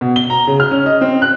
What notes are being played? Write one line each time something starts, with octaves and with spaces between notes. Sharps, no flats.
B2
G7
A#5
C#3
F6
C#4
D#5
C4
F#6